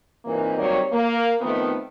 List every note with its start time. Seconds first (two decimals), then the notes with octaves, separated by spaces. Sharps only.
0.25 G2 A#2 E3 A#3 C4 D#4
0.57 D#3 F#3 G3 A#3 C4 C#5
0.92 A#3
1.41 D#3 F3 A3 B3 C4 D#4